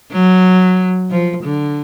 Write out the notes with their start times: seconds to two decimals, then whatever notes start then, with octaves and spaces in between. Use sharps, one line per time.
0.12 F#3
1.11 F3
1.43 D3